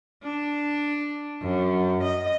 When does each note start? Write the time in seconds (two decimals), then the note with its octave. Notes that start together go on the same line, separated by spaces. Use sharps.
0.23 D4
1.42 F#2
2.03 D#5